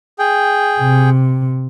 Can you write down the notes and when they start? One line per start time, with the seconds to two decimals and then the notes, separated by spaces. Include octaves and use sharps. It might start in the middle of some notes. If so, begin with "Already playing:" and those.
0.19 G#4 G5
0.80 C3